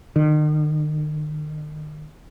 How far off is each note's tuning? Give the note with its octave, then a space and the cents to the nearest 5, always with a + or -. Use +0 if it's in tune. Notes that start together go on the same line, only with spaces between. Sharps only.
D#3 -40